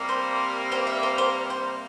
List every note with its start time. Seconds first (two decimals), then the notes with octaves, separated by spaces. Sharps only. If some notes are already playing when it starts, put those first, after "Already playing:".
Already playing: C3 G3 A#3
0.09 C5
0.72 C5
0.87 E5
1.03 C5
1.18 C5
1.50 C5